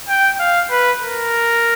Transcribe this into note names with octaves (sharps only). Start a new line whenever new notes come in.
G5
F5
B4
A#4